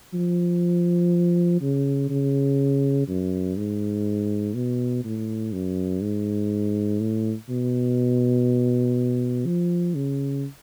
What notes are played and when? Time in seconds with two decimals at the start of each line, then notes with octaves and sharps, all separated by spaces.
0.14 F3
1.61 C#3
2.10 C#3
3.08 F#2
3.57 G#2
4.55 B2
5.04 A2
5.53 F#2
6.02 G#2
7.01 A2
7.49 B2
9.46 F3
9.95 C#3